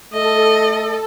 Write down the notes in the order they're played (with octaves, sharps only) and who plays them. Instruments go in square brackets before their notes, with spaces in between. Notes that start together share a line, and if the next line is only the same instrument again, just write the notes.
[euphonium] A3 [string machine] A4 [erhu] D#5